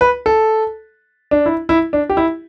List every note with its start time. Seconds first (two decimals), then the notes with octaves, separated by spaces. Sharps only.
0.01 B4
0.26 A4
1.31 D4
1.46 E4
1.69 E4
1.93 D4
2.09 G4
2.17 E4